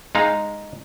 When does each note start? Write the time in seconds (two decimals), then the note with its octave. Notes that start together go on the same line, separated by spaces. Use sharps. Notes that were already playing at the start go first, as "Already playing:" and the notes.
0.15 G#3 D#4 F5